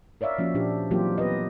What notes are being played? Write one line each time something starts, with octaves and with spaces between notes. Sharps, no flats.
A#4 C#5 D5 E5 F5
F3 A#3 C#4 F#4
A#2 D4 G4
E3 F#3 A#3 C4 F4 G4
B3 G4 B4 D#5